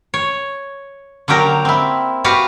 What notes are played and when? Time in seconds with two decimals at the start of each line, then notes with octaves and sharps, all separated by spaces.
0.14 C#5
1.28 D3 F#3 A#3 G4 A#4
1.65 C4 E4
2.24 F#4 G4 B4 F5 F#5